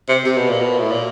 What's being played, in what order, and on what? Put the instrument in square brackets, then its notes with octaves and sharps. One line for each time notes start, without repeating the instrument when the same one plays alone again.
[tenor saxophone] C3
C3
B2
A#2
B2
A2
A#2